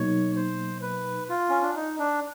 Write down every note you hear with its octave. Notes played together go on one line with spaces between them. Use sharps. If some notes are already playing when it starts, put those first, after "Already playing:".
Already playing: B2 F#3 A#3 D#4 C#5
C5
B4
F4
C#4
D4
D#4
D4